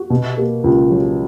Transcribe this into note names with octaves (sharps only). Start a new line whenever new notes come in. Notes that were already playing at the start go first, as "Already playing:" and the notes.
Already playing: F#4
B2
A#3
C#2
F#3